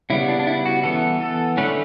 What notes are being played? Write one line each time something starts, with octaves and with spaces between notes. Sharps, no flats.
C#3 G3 B3 E4
D4
D4
E4
F#4
E3 B3 A4
A4
D3 A3 C#4 B4